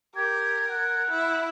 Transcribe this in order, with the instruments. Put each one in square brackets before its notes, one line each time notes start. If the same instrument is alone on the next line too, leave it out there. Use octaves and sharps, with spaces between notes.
[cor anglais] G4 [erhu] A#4 [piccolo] G#6
[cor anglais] F#5
[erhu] E4